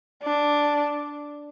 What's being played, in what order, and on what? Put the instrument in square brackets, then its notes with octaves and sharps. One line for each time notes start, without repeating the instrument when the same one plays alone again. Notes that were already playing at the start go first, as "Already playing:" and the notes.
[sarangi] D4